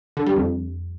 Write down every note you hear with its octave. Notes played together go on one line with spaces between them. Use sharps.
D3
G3
F2